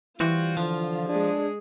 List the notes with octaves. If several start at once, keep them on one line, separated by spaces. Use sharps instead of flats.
E3 G3 C4 F4 F#4
D3 F3
G#3 D4 G#4